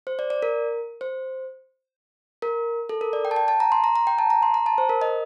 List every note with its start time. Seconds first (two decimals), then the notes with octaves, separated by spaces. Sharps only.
0.07 C5
0.19 D5
0.30 D5
0.42 A#4
1.01 C5
2.42 A#4
2.89 A4
3.01 A#4
3.13 D5
3.25 G5
3.31 A5
3.36 G5
3.48 A5
3.60 A#5
3.72 C6
3.84 A#5
3.96 A#5
4.07 G5
4.19 A5
4.30 A#5
4.43 C6
4.54 A#5
4.66 A5
4.78 C5
4.89 A#4
5.01 D#5